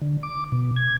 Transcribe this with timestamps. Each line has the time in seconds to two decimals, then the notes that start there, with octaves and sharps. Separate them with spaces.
0.02 D3
0.23 D6
0.52 B2
0.76 G#6